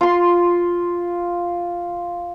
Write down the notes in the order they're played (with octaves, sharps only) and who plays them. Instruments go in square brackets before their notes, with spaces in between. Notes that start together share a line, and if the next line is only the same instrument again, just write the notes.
[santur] F4 C6